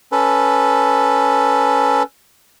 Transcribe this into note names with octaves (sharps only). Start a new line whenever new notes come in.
C#4 A4 B4